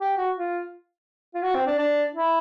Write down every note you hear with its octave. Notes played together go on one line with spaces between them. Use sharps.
G4
F#4
F4
F4
F#4
C4
D4
D4
E4